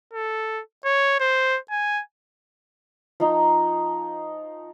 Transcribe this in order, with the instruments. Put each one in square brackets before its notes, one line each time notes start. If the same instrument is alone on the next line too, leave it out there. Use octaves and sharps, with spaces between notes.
[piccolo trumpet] A4
C#5
C5
G#5
[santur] F3 D#4